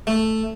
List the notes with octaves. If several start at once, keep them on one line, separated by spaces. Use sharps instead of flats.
A3